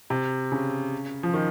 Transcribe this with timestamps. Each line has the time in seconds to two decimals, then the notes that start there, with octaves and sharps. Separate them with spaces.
0.10 C3
0.52 C#3
1.23 F3
1.34 D#3